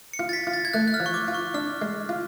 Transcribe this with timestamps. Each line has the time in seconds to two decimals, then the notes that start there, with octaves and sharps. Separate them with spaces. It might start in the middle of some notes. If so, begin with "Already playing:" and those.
0.13 C#7
0.19 F4
0.29 A6
0.33 B6
0.47 F4
0.54 A6
0.65 G#6
0.73 A3 F#6
0.88 F#6
0.94 F6
1.00 F3
1.06 C#6
1.14 D6
1.28 F4
1.34 C#6
1.54 D4 F6
1.82 G#3
2.09 F4